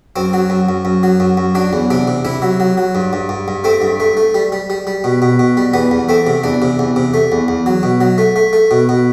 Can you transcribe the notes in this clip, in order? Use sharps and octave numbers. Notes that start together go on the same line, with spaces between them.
F#2 C4
F#3
F#2
F#2
F#2
F#3
F#2
F#2
F#3 D4
E2
C3 D4
C3
C3 E4
F#3
F#3
F#3
G2
G2
G2
G2
A3 C4
G2
A3
A3
G3
G3
G3
G3
B2
B2
B2
G3
E2 B3
E2
A3 C4
C3
E2 D4
C3
E2
C3
A3
E2
E2
F#3
B2
F#3
A3
A3
A3
B2
B2